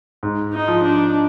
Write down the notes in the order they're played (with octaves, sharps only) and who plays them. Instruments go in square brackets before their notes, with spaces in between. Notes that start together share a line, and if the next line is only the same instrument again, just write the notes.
[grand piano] G#2
[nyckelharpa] D#4
[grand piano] F3
[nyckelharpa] D4